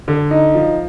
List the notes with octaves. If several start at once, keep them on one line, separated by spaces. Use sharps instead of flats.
D3
D#4
F3